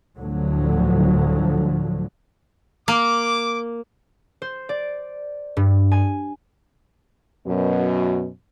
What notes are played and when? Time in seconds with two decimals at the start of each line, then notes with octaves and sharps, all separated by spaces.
0.18 D2 A2 D3 F3 F#3
2.88 A#3 D6
4.42 C5
4.69 D5
5.57 G2
5.92 G#5
7.46 F#2 B2